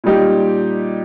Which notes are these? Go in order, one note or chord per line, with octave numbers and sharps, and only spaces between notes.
A#2 G3 D#4 G4